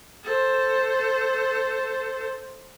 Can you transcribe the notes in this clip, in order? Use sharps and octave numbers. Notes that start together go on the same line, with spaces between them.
A4 C5